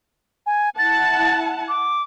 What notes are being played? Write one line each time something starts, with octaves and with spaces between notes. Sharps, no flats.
G#5
E4 F#5 A5 A6
D6